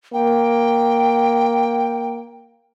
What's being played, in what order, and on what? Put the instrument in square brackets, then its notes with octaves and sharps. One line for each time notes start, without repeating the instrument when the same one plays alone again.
[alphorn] A#3 [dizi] G5